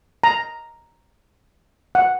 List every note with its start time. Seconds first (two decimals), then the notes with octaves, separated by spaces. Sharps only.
0.24 A#5
1.95 F#5